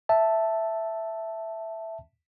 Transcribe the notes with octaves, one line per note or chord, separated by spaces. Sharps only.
E5 A5